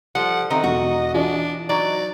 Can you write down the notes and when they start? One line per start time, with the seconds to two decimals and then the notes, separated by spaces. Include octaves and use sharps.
0.15 F3 G3 A4 F#5
0.50 D#3 C4 D#4 A4 D#5 E5
0.64 E1 F#4
1.14 E3 D4 F4 D5
1.69 F#3 D#4 D5